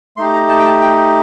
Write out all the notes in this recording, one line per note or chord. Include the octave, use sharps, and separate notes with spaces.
A3 D#4 G4 C6
A#5
A5
G5
A5
G5